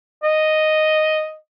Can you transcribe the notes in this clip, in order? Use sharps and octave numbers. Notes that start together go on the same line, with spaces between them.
D#5